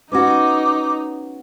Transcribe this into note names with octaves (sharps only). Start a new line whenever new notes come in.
B3 C#4 D#4 F#4 D6